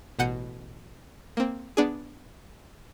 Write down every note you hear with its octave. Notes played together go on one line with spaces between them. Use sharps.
A1 B2 F#5 G6 C#7 D#7
A#3 C4
B3 D4 G#4